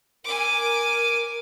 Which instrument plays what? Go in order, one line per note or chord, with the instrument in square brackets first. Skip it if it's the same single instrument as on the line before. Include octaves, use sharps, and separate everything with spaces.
[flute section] A#4 [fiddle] G#5 D6